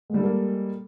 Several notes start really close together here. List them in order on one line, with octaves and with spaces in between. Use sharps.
G#3 G3 A4 A#3